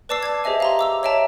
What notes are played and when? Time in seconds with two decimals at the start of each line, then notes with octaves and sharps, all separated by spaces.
0.09 B4 D5 A5 D6 E6 C7
0.23 A5 D6 G#6
0.44 G4 G#4 C5 D#5 E5 G#5
0.60 F5 A#5 C6
0.79 D6 E6 F7
1.03 C#5 D#5 E5 G5 A5 A#5